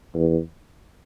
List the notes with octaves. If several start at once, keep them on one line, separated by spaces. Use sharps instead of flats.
E2